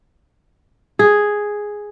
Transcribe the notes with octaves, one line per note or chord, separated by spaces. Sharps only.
G#4